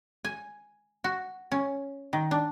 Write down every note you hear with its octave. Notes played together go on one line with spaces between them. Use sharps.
G#5
F#4
C#4
D#3
D4